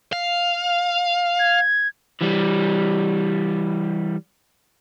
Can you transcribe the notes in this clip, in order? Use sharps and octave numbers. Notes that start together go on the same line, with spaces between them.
F5
G#6
E3 G3